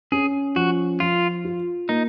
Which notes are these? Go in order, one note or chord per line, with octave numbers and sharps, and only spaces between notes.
C#4 G#4
F3 F#4
F3 F4
F4
A#3 D#4